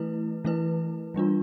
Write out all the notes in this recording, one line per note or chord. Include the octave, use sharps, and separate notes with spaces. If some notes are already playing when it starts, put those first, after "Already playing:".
Already playing: E3 A3 E4 B4
E3 A3 E4 B4
E3 G3 D4 F4